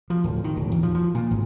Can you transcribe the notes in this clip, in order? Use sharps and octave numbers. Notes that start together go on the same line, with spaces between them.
F3
D1
D#3
D1
E2
F3
F3
A#2
G#1